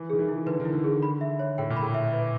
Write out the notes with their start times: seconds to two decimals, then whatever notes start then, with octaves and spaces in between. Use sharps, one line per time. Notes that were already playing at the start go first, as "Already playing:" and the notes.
Already playing: E3
0.10 D#3 G#4
0.19 E3
0.29 E4
0.46 D3 B4
0.60 D#3
0.65 E4
0.73 D3
0.84 G#4
1.02 B5
1.21 E5
1.39 C#5
1.58 A2 G5
1.70 A#2
1.77 B5
1.82 A2
1.94 E5
2.13 B4